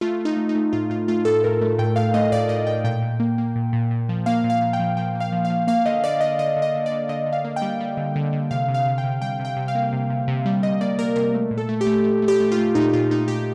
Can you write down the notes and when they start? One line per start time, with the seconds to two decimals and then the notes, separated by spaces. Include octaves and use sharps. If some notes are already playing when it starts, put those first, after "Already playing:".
0.01 A3 F4
0.20 A3
0.25 D#4
0.37 A3
0.49 D#4
0.55 A3
0.73 A2 F4
0.90 A2 F4
1.08 A3 F4
1.25 A2 A4
1.44 A2 A#4
1.61 A3
1.79 A2 G5
1.96 A2 F5
2.14 A3 D#5
2.32 A2 D5
2.49 A2 D#5
2.67 A2 G5
2.84 A#2 G5
3.02 A#2
3.20 A#3
3.38 A#3
3.56 A#2
3.73 A#2
3.91 A#2
4.09 F3
4.26 A#3 F5
4.44 A#2
4.50 F5
4.62 A#2
4.73 G5
4.79 F3
4.97 F3 G5
5.15 A#3
5.20 F5
5.32 F3
5.45 F5
5.50 F3
5.67 A#3 F5
5.86 D3 D#5
6.04 D3 D5
6.20 D3 D#5
6.39 D3 D#5
6.57 D3
6.62 D#5
6.75 D3
6.86 D5
6.92 D3
7.09 D3 D#5
7.26 D3
7.33 F5
7.45 A#3
7.56 G5
7.62 G3
7.81 G3
7.97 D3
8.16 D3
8.33 D3
8.51 C3 F5
8.69 C3
8.74 F5
8.86 C3
8.98 G5
9.04 C3
9.22 G3 G5
9.39 C3
9.45 G5
9.56 C3
9.68 F5
9.75 A#3
9.93 C3
10.10 C3
10.28 C3
10.46 G3
10.63 C3 D#5
10.81 A#3 D5
10.99 A#3 A#4
11.16 C3 A#4
11.34 A3
11.51 A#2
11.58 A4
11.69 A3
11.81 G4
11.86 A3
12.04 A3
12.22 A3
12.28 G4
12.40 A3
12.52 F4
12.57 A3
12.75 A#2 D#4
12.93 A#2 F4
13.11 A#2 D#4
13.28 A#2 G4